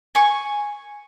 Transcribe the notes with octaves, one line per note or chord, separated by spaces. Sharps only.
G#5 C#6